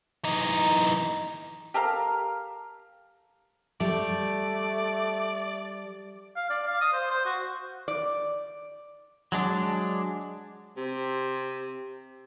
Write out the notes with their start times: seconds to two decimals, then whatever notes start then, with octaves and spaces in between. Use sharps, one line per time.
0.24 E3 D#4
1.74 G4 A4 A#4 F5
3.80 G3 A3 D5
6.36 F5
6.50 D5
6.67 F5
6.81 D#6
6.93 C5
7.11 C5
7.25 F#4
7.88 D5
9.32 F#3 G#3 D4
10.77 C3